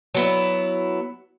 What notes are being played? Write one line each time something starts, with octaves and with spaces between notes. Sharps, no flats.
F#3 B3 E4